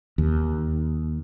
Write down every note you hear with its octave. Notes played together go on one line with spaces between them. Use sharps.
D#2